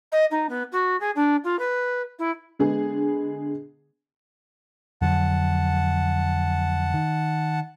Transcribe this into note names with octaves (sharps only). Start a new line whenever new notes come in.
D#5
D#4
B3
F#4
G#4
D4
F4
B4
E4
D3 G#3 B3 G#4
F2 D3 F#3 F#5 A5
D#3